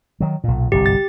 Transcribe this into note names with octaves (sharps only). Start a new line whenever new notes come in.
D#3 F#3
B1 A#2
G1 C2 G#2 G4
A6